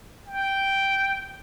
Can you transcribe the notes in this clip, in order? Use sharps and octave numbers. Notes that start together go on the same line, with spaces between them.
G5